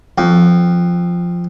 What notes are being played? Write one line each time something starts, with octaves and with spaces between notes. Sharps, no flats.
F2